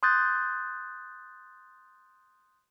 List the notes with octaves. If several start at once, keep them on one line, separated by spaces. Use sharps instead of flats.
C6 D#6 F#6 G6 A6